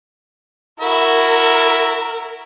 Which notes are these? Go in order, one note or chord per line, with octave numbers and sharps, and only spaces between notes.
E4 F#4 A#4 E5